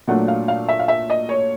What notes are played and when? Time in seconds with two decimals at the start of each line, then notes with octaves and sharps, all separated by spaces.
0.08 A#2 F#3 A3 D4 F#5
0.28 F5
0.48 F5
0.68 E5
0.79 F5
0.88 E5
1.10 D#5
1.29 C#5